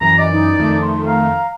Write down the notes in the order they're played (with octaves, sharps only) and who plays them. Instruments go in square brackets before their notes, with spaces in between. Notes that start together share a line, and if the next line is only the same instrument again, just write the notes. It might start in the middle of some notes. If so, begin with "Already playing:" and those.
[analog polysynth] F#2 E3 [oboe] A#5
[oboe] D5 [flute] D#5
[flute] D#4
[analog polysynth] F2 D#3 A3
[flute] C6
[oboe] F5 [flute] A#5